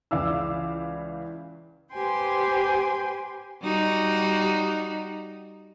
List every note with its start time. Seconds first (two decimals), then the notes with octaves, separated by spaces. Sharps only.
0.11 C#2 E3 D5 F5 D6 E6
1.93 G4 B4 C5 G5 G#5 C6
3.63 G3 D#4 F#4